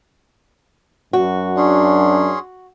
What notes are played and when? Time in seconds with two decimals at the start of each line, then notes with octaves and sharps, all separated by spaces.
1.13 F#2 F#4
1.57 C#4 D4 G#4 C6